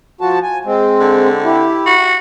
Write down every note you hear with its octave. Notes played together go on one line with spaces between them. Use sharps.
F3 F#4 A5
G#5
G#3 C4
D3
E4 G4
F#4